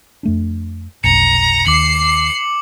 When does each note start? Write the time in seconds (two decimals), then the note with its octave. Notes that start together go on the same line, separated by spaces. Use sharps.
0.23 F2 A3 D4
1.04 F1 B1 A#5 C#7
1.67 D#2 D6 C7 C#7 F#7